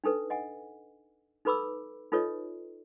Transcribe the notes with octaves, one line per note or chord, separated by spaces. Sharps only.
D4 D#4 A4 B4
D#5 F#5 G#5
D#4 A4 B4 B5 D6 E6
D#4 F4 A4 B4 C#5 D#5